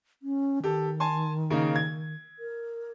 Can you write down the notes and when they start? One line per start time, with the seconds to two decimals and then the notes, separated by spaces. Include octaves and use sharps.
0.22 C#4
0.64 D#3 G4 A4
1.00 G#5 A5 C6
1.50 C#3 A#3 D#4
1.76 G#6
2.39 A#4